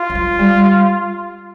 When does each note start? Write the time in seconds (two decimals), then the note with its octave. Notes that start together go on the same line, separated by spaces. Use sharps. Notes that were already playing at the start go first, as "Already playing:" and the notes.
Already playing: F4
0.10 D#3
0.15 F3
0.39 G3